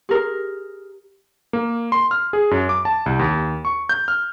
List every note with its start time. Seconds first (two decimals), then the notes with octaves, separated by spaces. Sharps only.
0.09 G4 G#4 A#4
1.53 A#3
1.92 C6
2.11 F6
2.33 G#4
2.51 F#2
2.69 D6
2.85 A5
3.06 C2
3.19 D#2
3.65 C#6
3.89 G6
4.08 F6